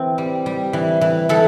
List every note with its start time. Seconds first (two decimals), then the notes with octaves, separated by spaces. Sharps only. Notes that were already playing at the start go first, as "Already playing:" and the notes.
Already playing: E3 C4
0.18 G3
0.46 G3
0.73 E3
1.01 E3
1.29 E3 A4